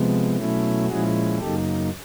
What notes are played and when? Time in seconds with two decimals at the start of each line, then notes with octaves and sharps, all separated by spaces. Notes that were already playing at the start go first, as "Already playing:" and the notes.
Already playing: C3 F3 G#3 B3
0.36 B2 F#3 A3 C#4 E4
0.87 A#2 F3 G#3 C#4 E4 F#4 G#4
1.39 F#2 C#3 F#3 A#3 D#4 G4 A4